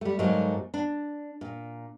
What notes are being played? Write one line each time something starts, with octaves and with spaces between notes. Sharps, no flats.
G3 A3
G#2 F#3 G3 A3 A#3
D4
A#2